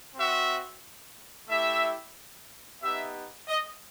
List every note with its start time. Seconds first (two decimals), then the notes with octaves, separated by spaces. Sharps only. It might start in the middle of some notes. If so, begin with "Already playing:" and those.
0.15 C4 F#4 E5
1.49 A3 E4 G4 E5
2.81 B3 D#4 G4 E5
3.48 D#5